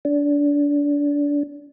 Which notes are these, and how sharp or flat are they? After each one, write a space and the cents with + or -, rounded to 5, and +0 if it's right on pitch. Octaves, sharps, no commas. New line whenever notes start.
D4 -25